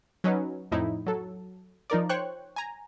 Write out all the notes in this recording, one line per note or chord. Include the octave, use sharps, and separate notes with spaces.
F#3 C#4 D#4 B4
F2 A2 D#4 E4
F#3 A4
F3 D#4 A#4 D5
C5 C#5 G5 C#6 F#6
G#5 A#5